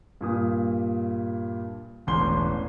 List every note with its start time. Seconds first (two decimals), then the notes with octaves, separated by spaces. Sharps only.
0.21 G2 A#2 D#6
2.07 E1 A1 C6 G7